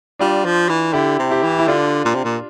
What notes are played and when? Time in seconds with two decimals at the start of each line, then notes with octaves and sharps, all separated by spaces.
0.19 G3 D4 F4
0.45 F3
0.69 E3
0.93 D3 E4 G4
1.19 C3
1.30 E4 G4
1.43 E3
1.59 E4
1.67 D3 D4 F4
2.05 A#2
2.15 C3
2.24 A#2